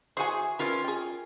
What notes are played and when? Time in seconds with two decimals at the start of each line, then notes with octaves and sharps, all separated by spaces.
0.17 E3 F#4 G#4 C5 G#5
0.59 C4 C#4 F4 A#4 B4
0.84 G#4 G5